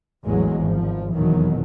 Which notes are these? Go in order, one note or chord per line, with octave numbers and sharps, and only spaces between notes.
A1 E2 F#3 G#3
G#1 F3
F1 E2 B2 D#3 E3 F#3